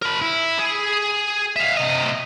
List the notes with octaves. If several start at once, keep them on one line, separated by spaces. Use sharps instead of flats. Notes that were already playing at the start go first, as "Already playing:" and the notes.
A#4 B5
E4
G#4
E5 F5
C3 D#5